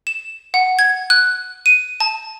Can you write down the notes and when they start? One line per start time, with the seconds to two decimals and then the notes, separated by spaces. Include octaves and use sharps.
0.07 E7
0.54 F#5
0.79 G#6
1.10 F#6
1.66 D#7
2.00 A5